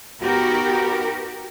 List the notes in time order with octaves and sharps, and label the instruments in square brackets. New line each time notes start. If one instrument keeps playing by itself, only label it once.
[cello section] B3 D#4 F#4 G4 A#4